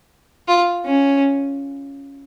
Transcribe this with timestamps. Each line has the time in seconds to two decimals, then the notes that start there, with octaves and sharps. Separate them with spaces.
0.48 F4
0.85 C#4